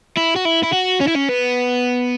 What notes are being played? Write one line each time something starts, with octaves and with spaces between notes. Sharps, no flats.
E4
F#4
E4
E4
F#4
C#4
E4
C#4
B3